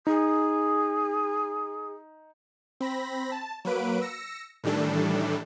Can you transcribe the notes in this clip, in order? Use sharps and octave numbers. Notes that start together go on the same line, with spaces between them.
D#4 G#4
C4 B5 A#6
A5
F#3 A#3 B4 D7
E6 A#6 C#7
A2 D#3 E3 G3 D4 A4